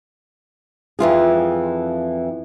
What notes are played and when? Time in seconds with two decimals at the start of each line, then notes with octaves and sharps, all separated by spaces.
0.99 F2 E3 F4 G#4